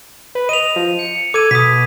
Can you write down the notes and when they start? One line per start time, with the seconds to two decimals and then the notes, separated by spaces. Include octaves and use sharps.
0.35 B4
0.49 D#5 D#7 F7
0.76 F3
0.99 C#7
1.34 A4 D6 G#6 D#7
1.51 B2 D#6 B6